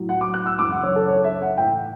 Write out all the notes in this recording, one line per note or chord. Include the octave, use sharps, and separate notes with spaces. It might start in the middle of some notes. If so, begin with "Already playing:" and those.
Already playing: A2 F#3
F#5
D6
F#6
E6
F#2 C#3 E3 D6
F#5
C#5
A4
C#5
E5
F#5
A2 E3 G5